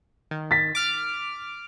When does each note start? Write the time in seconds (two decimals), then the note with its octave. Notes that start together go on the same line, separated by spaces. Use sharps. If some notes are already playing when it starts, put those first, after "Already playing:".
0.31 D#3
0.51 A6 B6
0.75 D6 F6